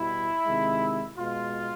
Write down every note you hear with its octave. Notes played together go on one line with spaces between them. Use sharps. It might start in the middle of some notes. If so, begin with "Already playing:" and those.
Already playing: B2 G3 E4
C3 D#3 G#3
B2 G#3 F4